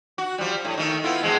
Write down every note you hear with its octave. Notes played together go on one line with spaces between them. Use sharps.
F#4
F3 G3
A2
D#3 A3
B3 E4 F4
B2 F3 G#3